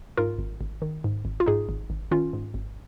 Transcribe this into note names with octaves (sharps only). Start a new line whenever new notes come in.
G#2 F4 A#4
G#1
G#1
D#3
G#2
G#1
F4
G#2 D#4 G#4
G#1
G#1
D#3 C#4 F4
G#2
G#1